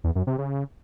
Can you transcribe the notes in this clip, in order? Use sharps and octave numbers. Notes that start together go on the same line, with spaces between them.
E2
F#2
C3
C#3